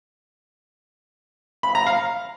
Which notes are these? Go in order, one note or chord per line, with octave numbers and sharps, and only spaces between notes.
B5
A#5
F5